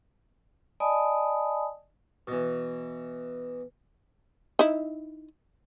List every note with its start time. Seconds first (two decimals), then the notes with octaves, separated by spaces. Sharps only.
0.80 D5 D#5 G#5 A5 B5 D#6
2.27 B2 E3
4.59 D#4 E4